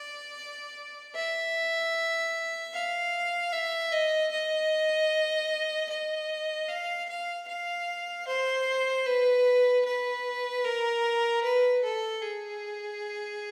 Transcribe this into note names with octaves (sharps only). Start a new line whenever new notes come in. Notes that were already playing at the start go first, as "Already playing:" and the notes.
Already playing: D5
E5
F5
E5
D#5
D#5
D#5
F5
F5
F5
C5
B4
B4
A#4
B4
A4
G#4